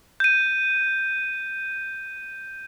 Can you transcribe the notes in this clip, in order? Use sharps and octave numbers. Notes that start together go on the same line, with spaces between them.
G6 D#7